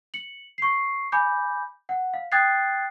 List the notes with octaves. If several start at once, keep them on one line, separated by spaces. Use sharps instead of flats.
C#7 F#7
C#6 C7
G#5 B5 D6 G6
F#5
F5
G5 D#6 F#6 G#6 A6 C7